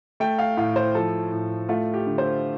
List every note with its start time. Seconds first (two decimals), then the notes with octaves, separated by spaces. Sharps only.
0.20 A3 G5
0.39 F5
0.57 A2 F5
0.76 C5
0.95 F3 A4
1.32 A2
1.69 A3 F4
1.94 G4
2.07 D3
2.18 C5